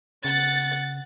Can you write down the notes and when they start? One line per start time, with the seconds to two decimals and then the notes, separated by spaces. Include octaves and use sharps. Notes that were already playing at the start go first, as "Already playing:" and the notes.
0.25 C#3 F#5 A6